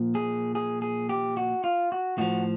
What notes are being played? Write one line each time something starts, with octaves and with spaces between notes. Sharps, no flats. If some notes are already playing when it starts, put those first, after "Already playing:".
Already playing: A#2 F3
G#4
G#4
G#4
G4
F#4
F4
F#4
A2 F3 F#4